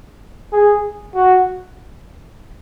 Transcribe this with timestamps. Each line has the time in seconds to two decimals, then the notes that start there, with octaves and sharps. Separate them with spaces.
0.52 G#4
1.15 F#4